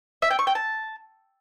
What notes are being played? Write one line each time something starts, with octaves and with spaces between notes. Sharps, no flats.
E5
G5
C#6
G5
A5